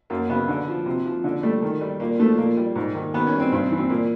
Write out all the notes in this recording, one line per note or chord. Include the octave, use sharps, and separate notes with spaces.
F#2 A#3
C#3 B3
D3
F3
C3
F3
D3
G3 A3
D#3
G3
A#2 A#3
F3 A3
A#2 A#3
G3
G#2
D#3
D#3 B3
C#4
G3
C4
G2 C4
E3
C4
A#2 A#3